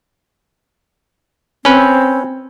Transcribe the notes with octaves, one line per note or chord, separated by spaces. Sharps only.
C4 C#4 B4